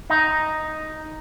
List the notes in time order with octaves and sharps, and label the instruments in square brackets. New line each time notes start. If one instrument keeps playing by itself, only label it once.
[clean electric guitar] D#4